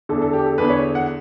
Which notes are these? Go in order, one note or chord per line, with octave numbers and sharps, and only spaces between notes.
E2 D3 A4
A4
G4
A4
E2 D3 B4
C#5
F#5